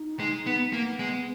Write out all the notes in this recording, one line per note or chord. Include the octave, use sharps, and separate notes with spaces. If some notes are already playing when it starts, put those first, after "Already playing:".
Already playing: D#4
G#3
B3
A#3 B3
G#3